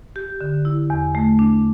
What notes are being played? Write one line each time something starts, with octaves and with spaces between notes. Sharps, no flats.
G4
D3
E4
E2
A3
D4